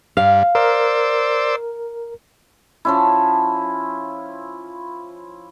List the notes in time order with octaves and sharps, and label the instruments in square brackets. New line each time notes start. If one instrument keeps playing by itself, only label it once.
[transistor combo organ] G2 [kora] F5
[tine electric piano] A#4 [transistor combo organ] C5 D5 E6
[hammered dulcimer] F3 C#4 E4